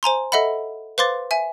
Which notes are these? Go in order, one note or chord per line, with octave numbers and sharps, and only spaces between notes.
C5 G#5 A#5 C6
A4 D#5 E5 F#5 B5
B4 C5 F5 C6 D6 A6
E5 G#5